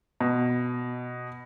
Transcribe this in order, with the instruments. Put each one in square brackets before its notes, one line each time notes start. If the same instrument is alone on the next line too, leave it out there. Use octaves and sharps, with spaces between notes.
[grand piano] B2